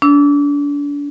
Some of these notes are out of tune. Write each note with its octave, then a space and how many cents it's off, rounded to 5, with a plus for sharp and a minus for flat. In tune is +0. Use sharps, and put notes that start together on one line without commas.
D4 -35 E6 +0